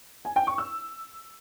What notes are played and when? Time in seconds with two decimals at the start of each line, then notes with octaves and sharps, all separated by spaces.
0.25 G#5
0.36 G5
0.47 C#6
0.58 E6